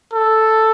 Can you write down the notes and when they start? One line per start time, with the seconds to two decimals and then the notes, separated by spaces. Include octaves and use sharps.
0.13 A4